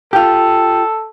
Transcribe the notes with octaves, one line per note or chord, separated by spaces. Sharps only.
F4 G4 A4